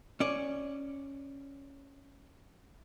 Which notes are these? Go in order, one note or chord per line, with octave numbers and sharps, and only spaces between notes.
C#4 D5